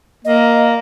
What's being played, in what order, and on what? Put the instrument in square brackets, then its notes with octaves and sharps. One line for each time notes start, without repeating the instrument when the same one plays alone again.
[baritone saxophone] A#3 [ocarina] D#5